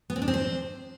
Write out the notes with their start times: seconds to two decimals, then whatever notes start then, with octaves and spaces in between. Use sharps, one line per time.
0.10 B3
0.16 C4
0.22 D4
0.28 C4
0.34 C5